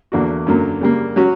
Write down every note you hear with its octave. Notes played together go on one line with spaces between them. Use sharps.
E2 D3 A#3 D4 F#4
F#2 D3 F#3 A#3
C#3 G3 A#3
F#3 C#4 F#4